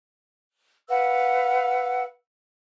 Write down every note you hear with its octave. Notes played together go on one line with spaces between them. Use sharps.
B4 F5 F#5 E6